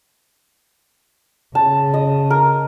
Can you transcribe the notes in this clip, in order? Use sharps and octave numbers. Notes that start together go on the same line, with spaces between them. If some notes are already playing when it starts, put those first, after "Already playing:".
C#3 A5
D#5
A#4